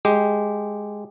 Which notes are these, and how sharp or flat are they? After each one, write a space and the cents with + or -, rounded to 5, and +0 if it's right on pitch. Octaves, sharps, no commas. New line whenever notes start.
G#3 +0 G4 +0